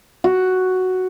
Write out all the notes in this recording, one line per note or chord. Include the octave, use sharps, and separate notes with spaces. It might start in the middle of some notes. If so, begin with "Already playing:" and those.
F#4